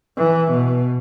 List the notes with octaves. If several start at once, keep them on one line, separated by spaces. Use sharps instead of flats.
E3
B2